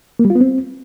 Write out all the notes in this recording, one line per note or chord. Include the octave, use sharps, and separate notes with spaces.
A#3
G3
F4
B3
C4